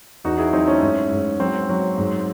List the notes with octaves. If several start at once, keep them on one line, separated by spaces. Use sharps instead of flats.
E2 D#4 F#4
E4 G#4
F#3 C4 D#4
A3 C#4
G#2
G#2
F#3 C4
F#3
G#2